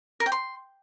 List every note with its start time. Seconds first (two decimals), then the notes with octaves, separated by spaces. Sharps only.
0.20 A#4
0.26 G5
0.32 C6